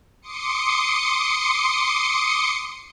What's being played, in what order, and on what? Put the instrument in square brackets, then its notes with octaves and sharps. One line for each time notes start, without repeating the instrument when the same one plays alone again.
[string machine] C6 D6 D#6 C#7